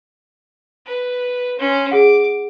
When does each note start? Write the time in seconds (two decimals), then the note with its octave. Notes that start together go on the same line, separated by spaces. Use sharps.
0.85 B4
1.58 C#4 C6
1.91 G#4 F#5 D6